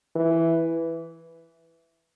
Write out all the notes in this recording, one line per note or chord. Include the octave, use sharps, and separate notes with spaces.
E3